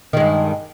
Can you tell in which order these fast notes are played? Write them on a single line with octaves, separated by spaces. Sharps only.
D#3 G#3 G2